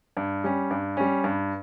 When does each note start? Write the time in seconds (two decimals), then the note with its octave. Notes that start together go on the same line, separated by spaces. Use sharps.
0.17 G2
0.44 G3 C#4
0.70 G2
0.97 G3 C#4
1.24 G2